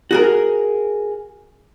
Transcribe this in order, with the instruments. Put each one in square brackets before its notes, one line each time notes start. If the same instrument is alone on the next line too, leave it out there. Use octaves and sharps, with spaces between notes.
[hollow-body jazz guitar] F#4 G#4 A#4